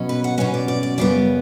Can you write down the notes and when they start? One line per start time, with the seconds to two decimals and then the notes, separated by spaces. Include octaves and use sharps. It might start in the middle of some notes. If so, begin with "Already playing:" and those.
Already playing: B2 F#3 C#4
0.09 B4
0.24 F#5
0.38 B2 F#3 C#4 B4
0.54 D5
0.68 D5
0.83 D5
0.98 F#2 C#3 G3 B3 D5